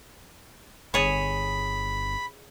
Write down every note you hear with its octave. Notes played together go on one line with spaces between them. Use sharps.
G1 G#4 C#5 B5